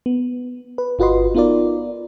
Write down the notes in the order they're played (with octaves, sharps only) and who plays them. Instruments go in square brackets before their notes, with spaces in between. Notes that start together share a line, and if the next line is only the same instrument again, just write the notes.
[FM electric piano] B3
B4
G1 F4 F#4 B4 D#5 C6
B3 D#4 F4 A#4 D5